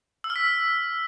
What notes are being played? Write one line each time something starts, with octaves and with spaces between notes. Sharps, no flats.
E6
F6
B6